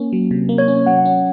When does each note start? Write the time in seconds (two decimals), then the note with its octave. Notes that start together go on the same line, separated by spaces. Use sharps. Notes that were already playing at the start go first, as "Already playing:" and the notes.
Already playing: A#3 C#4
0.13 F#3
0.31 C3
0.49 A#3
0.58 C#5
0.68 C#4
0.86 F#3 F#5
1.05 C#4